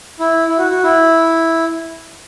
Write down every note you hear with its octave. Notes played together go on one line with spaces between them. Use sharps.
E4
E4
F#4
F#4
E4